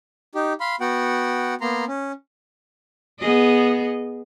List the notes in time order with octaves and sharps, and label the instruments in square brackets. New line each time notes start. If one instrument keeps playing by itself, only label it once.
[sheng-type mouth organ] D#4 G4
F5 B5 C6
B3 F#4 F#5 G5
A#3 B3 A#5 C6
C#4
[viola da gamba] B3 G#4 D#5